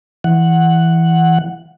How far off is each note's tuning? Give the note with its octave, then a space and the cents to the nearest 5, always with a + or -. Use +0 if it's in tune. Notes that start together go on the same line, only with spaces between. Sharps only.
E3 +0 F#5 +0